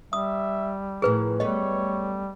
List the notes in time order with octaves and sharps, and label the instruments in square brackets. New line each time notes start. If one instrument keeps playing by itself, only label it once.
[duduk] G3 [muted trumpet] E5 [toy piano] D#6
[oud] A2 E3 F3 [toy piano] G#4 B4 [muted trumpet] A#4
[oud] F#2 A3 B3 [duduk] G3 [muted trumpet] C#5 [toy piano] D#5